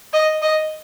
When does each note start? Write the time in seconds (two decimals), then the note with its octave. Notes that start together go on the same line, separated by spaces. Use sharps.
0.13 D#5
0.42 D#5